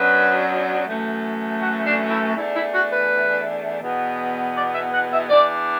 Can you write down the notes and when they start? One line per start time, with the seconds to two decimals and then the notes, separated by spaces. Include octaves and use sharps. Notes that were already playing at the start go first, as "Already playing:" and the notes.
Already playing: F#2 F#3 B3 D4 B4
0.87 F#2 E3 A3
1.61 F#4
1.86 D4
2.10 E4
2.35 E2 E3 A3 D4 E4
2.54 E4
2.72 F#4
2.90 B4
3.82 E2 B2 B3
4.56 D5
4.75 E5
4.93 F#5
5.11 E5
5.30 E2 E3 D4 D5